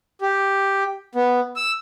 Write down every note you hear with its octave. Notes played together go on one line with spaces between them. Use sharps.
G4
B3
E6